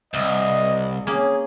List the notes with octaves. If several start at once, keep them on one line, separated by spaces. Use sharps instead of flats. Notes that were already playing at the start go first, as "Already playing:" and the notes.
C2 D#5
A#3 C#4 G#4